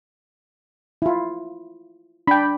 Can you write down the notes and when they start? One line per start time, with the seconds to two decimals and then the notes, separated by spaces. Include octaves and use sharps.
1.02 E4 F4
2.27 D4 G5 B5